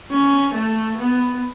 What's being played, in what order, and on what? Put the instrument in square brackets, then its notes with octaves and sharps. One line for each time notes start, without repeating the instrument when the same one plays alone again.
[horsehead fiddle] C#4
A3
B3